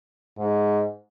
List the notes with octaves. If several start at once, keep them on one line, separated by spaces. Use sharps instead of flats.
G#2